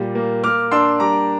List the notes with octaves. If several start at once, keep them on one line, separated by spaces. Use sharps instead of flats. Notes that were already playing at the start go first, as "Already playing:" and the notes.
Already playing: A#2 G3
A#3
A#3 D6 F6
D4 C6 E6
G3 A#5 D6